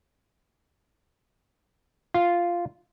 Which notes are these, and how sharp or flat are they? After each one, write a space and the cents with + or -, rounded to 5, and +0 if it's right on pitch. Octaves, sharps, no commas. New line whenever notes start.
F4 -5